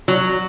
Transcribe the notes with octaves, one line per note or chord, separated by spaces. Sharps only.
F#3